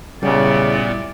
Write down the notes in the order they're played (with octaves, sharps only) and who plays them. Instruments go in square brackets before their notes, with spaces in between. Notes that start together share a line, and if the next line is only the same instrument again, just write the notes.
[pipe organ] A#2 B3 [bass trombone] C#3 [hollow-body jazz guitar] G3 [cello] E4 D5